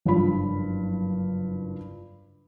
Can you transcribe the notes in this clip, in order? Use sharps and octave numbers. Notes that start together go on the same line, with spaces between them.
F#1 G2 F3 B5